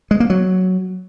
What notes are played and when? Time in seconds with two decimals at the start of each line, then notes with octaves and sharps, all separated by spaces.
0.11 G#3
0.20 A#3
0.30 F#3